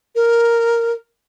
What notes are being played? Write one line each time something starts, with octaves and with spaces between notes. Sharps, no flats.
A#4